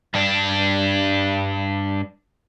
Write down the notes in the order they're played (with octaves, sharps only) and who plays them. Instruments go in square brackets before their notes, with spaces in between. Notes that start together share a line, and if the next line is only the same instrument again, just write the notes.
[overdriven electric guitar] G2 D4